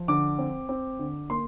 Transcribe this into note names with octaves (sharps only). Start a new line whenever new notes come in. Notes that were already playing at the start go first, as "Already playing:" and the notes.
Already playing: F3
D3 D6
C4
C4
D3
A#3 C6